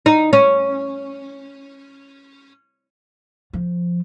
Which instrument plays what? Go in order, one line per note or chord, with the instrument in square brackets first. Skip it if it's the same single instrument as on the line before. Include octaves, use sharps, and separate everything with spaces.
[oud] D#4
C#4
[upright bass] F3